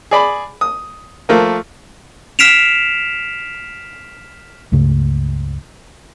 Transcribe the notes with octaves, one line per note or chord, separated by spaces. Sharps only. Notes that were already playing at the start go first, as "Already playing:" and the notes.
G#4 D5 B5
D#6
F3 A3 A#3
F6 B6 C7 D7 E7 F7
C#2 G2 C#3 A3